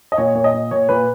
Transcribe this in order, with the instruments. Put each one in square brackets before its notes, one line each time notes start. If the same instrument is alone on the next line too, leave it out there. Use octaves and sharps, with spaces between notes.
[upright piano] D#5
A#2 C#5
A#2 C#5
D#5
A#2
A#2 C#5
A#2 B4